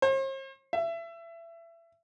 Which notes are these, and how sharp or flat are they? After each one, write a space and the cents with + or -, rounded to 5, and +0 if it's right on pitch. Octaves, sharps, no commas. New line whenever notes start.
C5 +45
E5 +25